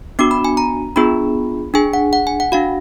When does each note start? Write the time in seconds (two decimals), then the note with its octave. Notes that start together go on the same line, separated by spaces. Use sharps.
0.19 B3 D4 F#4 D6
0.31 B5
0.44 G#5
0.57 A#5
0.96 B3 D4 F4 G#4 B5
1.74 D4 G#4 G#5
1.93 F#5
2.13 F#5
2.27 G#5
2.40 F#5
2.52 D4 F#4 F5